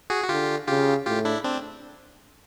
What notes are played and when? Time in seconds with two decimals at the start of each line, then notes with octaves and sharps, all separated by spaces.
0.10 F#4 G#4
0.24 F#4
0.29 D3 F4 G4
0.68 C#3 F4 G4
1.06 A2 F4 G4
1.25 D4 E4
1.44 C4 D4